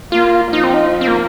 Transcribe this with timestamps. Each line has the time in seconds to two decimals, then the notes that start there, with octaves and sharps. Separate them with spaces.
0.12 A#3 F4
0.52 F3 D#4
0.64 C4
0.74 D#4
1.01 C4
1.08 A#3